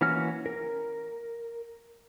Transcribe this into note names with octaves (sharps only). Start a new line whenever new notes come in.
E3 A#3 C#4 F#4 F6
A#4